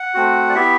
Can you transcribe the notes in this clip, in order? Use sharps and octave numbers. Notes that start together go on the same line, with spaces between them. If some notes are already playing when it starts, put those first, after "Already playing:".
Already playing: F#5
A3 C4 F#4
D5
B3 E4 G4 E5